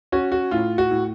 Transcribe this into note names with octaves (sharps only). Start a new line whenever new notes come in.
C#4 F#4
F#4
A2 F4
F#4
A2